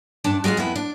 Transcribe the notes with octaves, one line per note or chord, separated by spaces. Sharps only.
G2 D4 D5 A5
F#3 G#3 F4 F#4 G#4
F2 B3 E4
D4